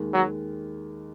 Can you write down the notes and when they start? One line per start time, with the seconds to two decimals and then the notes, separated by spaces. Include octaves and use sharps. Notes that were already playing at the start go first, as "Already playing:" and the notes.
Already playing: D#2 D#3 G#3
0.13 F#3